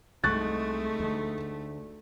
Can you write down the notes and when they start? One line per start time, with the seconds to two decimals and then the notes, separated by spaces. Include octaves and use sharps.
0.24 C2 C3 G#3 A3 D#4 C#6 F#6 A6
1.00 D2 D3